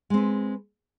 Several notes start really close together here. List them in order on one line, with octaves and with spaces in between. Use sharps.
G#3 C4 B4